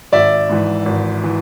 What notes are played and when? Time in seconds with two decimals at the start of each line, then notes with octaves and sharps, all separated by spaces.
0.12 G#1 D5 E5
0.49 G#2 E3
0.86 G#1
1.24 E3